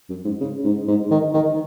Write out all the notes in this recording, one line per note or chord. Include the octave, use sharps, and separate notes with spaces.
F#2
G#2
C#3
G#2
G#2
D#3
D#3